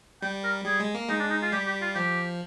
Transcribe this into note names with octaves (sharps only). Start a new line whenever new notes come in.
G3 G5
A#4
G3 G#4
G#3
A#3
G#3 D#4
D4
D#4
F4
G3 G4
G4
F4
F3 G4